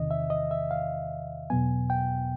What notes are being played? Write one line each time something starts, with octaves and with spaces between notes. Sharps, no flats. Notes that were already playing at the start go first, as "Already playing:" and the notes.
Already playing: E2 C3 D#3 D#5
E5
D#5
E5
F5
E2 B2 F#3 B3 G#5
G5